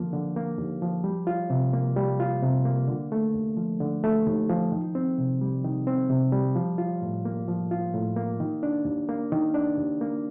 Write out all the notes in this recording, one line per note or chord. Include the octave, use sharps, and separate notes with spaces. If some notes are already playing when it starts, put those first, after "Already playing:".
Already playing: D#2 D3 F3 A#3
D3
A#3
D#2
F3
G3
F4
C3
A#3
G3
F4
C3
A#3
D3
A3
D#2
F3
D3
A3
D#2
F3
D#3
C4
C3
G3
D#3
C4
C3
G3
F3
F4
A2
A#3
F3
F4
A2
A#3
D#3
D4
D#2
A#3
D#3
D4
D#2
A#3